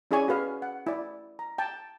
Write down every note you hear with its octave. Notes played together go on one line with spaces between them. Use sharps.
C#4 E4 G#4 D5 G#5 C#6
F#4 G#4 B4 F5
F#5
E4 D5
A#5
G5 A5